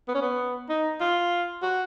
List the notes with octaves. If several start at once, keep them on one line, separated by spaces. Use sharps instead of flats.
B3
C#4
B3
D#4
F4
F#4